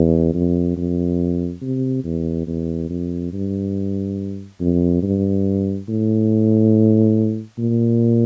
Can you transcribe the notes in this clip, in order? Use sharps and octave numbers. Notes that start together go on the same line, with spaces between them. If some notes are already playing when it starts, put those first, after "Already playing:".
Already playing: E2
F2
F2
C3
E2
E2
F2
G2
F2
G2
A2
A#2